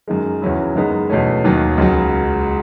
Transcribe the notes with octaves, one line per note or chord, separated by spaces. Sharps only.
F#2 D#3 G#3
E2 C#3 F#3 C#4 E4
F#2 D#3 G#3 B3 D#4
E2 B2 A3 C#4
D#2 D#3 F#3
C#2 C#3 F#3